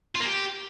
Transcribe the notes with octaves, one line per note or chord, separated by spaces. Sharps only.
F4
A#3
G4